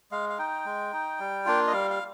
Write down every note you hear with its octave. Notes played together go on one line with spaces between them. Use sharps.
G#3 F5
F5
D#4 G5
G#3
D#4
G3
A#3 D4 F4
D#5
G3 F5
F5